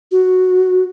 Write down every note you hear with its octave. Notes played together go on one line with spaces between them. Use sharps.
F#4